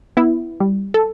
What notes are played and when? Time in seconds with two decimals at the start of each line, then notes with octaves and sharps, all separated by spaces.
0.17 B3 E4
0.60 G3
0.94 A4